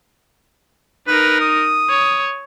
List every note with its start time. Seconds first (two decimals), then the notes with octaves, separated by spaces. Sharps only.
1.07 D#4 A#4 B4
1.41 D#6
1.90 C#5